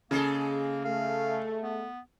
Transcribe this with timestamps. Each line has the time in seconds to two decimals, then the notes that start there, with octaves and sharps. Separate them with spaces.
0.11 C#3 G#3 A#3 G#4 A4
0.85 A3 F5
1.63 B3